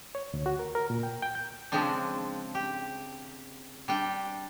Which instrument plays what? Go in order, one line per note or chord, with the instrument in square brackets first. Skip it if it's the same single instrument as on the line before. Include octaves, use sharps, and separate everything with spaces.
[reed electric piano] C#5
D2
F#4
A#4
A#4
A#2
G5
G5
G6
[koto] C#3 F3 G#3 C4 D4
G4
G3 D4 G5